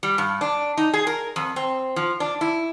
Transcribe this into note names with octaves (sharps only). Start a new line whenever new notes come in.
G3
G2
D4
D#4
G#4
A#4
F2
C4
F3
D4
E4